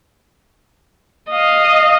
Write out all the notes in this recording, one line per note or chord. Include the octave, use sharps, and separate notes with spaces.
D#5 F5